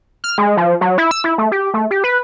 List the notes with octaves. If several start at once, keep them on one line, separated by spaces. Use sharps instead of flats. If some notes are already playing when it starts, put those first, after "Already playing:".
F6
G#3
F3
F#3
E4
E6
E4
A3
G4
A3
G4
B4